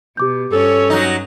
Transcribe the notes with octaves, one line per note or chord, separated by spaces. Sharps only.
B2 G4 D6 G6
G2 C#4 A4 C#5
F#3 D#4